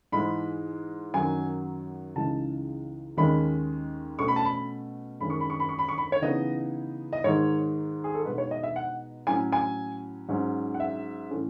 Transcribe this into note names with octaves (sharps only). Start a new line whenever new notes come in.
G#2 E3 G#3 B5
F#2 D#3 F#3 G#5
C#2 C#3 E3 G#3 D#4 A5
D#2 D#3 G#3 C#4 B5
B2 A3 C#4 C#6
B5
A5
B5
F#2 D#3 G#3 C#4 B5
C#6
B5
C#6
B5
C#6
B5
C#6
B5
C#5
C#3 E3 B3 D#4 D#5
D#5
G#2 D#3 G#3 D#4 C#5
G#4
A4
B2 G#3 D#4 B4
C#5
D#5
E5
F#5
A2 F#3 C#4 G#5
G#5
G#2 F#3 C#4
F#5
E5
A2 E3 A3 C#4